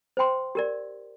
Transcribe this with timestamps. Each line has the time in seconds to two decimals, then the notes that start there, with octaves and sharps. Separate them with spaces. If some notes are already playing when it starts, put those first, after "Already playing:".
0.17 C5 G5 C6
0.55 G4 A#4 D5